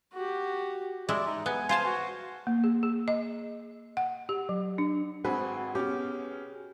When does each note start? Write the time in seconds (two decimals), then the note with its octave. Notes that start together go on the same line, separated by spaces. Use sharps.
0.13 F#4 G4
1.09 G#3 E4 D5
1.27 D#4
1.46 B3 G#5
1.69 F4 C5 G#5 A5
1.86 F#4
2.47 A#3
2.64 G#4
2.83 G#4
3.08 D#5
3.97 F#5
4.29 G4
4.49 F#3
4.78 D4
5.24 G#1 C4 F#4 G#4 B4
5.75 B2 C#4 G4 G#4